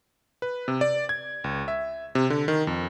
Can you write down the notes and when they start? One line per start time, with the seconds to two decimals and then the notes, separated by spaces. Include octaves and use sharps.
0.42 B4
0.68 C3
0.81 D5
1.09 G#6
1.44 C#2
1.68 E5
2.15 C3
2.30 D3
2.48 D#3
2.67 F2